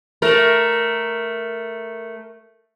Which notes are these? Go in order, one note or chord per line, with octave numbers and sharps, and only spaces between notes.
A3 A#4